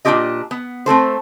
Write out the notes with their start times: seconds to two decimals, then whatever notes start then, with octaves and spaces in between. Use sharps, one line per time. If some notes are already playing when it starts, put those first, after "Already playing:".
0.05 A#2 C#4 D4 F4 G4 D#5
0.51 B3
0.86 A3 C4 A4 C5